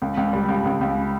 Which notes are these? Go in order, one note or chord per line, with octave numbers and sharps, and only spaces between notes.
C#2
C#2
G3
C#2
C#2
C#2